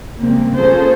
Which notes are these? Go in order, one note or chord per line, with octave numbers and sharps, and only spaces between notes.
C#3 G3 G#3 A#3 C4
A#3 C#4 F4 G#4 A4 C5